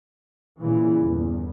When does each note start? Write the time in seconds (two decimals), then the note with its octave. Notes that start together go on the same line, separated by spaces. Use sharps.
0.59 A#2 C#3 E3
1.01 G1 E2